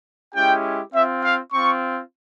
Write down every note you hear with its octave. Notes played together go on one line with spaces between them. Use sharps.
G#3 C#4 E4 G4 G5
C4 F4 E5
F5
C4 F4 C#6